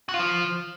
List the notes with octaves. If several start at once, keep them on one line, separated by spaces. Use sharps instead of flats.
F#4
F4
F3